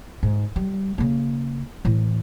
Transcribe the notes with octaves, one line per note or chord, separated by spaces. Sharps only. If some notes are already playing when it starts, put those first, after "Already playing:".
G#2
G3
C#3 A#3
A2 E3